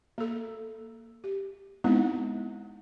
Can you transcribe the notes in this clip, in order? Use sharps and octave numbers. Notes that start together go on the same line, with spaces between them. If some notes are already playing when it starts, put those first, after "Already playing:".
A#3 A4
G4
G#3 B3 C4 D#4 E4